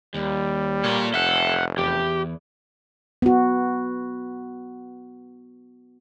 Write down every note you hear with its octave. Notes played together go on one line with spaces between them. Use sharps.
D#2 G3
A#2 A4 C#5
F1 A4 E5 F#5
E2 G4
B3 F#4